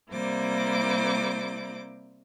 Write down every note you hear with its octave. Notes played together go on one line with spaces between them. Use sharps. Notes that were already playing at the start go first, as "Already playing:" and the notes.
C3 G3 A#3 E4 C5 D6